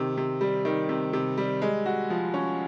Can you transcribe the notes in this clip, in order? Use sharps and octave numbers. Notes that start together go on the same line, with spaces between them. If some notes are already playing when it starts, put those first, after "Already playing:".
Already playing: C3 D#3
C3
G3
D#3
C3
C3
G3
G#3
F#4
F3
C#4